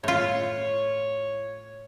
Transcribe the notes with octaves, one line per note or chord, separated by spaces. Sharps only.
A2 F4 C#5